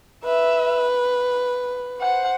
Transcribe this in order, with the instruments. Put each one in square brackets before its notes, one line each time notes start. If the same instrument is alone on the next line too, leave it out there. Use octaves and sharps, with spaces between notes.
[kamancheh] B4 [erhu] E5
[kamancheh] C5 [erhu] F#5